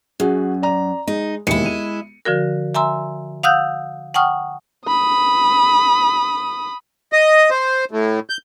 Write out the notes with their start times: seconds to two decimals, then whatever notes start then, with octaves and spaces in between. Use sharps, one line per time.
0.20 F#2 F#4 G#4
0.62 D5 A#5
1.07 G#3 D#4
1.47 E1 D#2 G#3 E4 C#7
1.66 D#7
2.25 D3 F3 F#4 A#4
2.75 E5 G#5 A#5 C6 E6
3.43 F5 F#5 D#6 E6 F#6 G6
4.14 F#5 G5 A5 C#6 D#6 F6
4.88 B5 D#6
7.13 D#5
7.50 C5
7.91 A2
8.30 G6